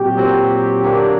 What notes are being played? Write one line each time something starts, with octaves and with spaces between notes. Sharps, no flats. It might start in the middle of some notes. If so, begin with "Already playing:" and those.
Already playing: A#2 F#3 C4 F#4 G4
A#2 F#3 C4 F#4
D3 F#3 A#3 D4